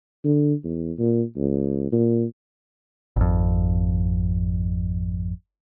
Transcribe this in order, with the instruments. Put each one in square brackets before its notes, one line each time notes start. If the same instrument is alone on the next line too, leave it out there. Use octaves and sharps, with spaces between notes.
[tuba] D3
E2
A#2
C#2
A#2
[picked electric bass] G#1 F2